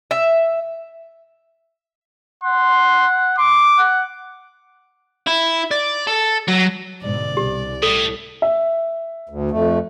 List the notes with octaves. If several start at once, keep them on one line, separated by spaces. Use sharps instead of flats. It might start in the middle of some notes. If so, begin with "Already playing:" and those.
E5
F#5 C6
C6 D6
F#5
E4
D5
A4
F#3
G#2 B2 D3 D5
C2 G4
A2 A4
E5
D2
F2 A3